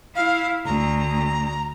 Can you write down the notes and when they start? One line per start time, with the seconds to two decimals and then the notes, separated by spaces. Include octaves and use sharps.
0.16 E4 F5
0.65 D2 A#5